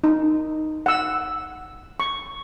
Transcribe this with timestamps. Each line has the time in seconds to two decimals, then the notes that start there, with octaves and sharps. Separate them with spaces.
0.04 D#4
0.86 F#5 E6
2.00 C#6